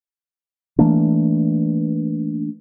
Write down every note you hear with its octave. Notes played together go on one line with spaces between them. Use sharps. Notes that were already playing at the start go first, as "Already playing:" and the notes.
E3 A3 A#3 D4